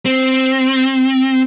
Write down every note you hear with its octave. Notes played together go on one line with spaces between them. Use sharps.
C4